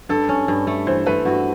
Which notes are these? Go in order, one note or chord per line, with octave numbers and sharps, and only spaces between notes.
G2 A4
C#4
G2
A3
E3 C5
A3 B4
G2 F#4